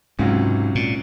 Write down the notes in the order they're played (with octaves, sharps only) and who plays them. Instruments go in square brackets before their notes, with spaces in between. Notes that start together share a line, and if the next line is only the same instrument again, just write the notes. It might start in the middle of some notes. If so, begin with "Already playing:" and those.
[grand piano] C#2 C3 F#3 C#4 F4 [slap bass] G#2
[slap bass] A#2